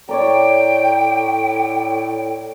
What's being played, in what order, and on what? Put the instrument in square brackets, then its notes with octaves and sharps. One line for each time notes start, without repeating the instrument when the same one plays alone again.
[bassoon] A2 [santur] C#5 D5 A#5 [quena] G5